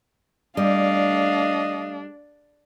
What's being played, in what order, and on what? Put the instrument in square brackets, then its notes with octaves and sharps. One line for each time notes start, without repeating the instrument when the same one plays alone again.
[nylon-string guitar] G3 [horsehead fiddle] A3 F5 [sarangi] D4 [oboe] D#5